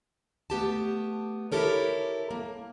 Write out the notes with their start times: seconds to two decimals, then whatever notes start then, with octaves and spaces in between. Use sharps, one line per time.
0.50 A3 B3 G4 A5
1.52 E4 G4 A4 A#4 C#5
2.31 A#3